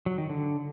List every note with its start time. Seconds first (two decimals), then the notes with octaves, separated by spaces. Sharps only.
0.06 F#3
0.18 D#3
0.30 D3